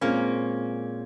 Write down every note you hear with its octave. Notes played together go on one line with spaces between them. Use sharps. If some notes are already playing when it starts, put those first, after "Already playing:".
A#2 G#3 A#3 C4 C#4